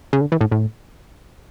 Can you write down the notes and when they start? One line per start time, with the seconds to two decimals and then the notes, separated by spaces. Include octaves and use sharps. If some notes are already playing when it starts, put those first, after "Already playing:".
0.13 C#3
0.21 D3
0.32 E3
0.41 A2
0.51 A2